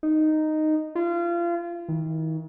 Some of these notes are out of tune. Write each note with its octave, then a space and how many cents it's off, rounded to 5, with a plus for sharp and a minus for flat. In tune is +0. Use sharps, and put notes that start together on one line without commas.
D#4 -5
F4 -30
D#3 +40